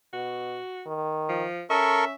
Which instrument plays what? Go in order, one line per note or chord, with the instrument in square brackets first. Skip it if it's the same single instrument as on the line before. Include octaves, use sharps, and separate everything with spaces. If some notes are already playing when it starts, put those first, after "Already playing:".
[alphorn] B2 [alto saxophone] F#4
[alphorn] D#3
[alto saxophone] F3
[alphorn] C#4 [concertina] A4 A#4 C#6 [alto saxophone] E5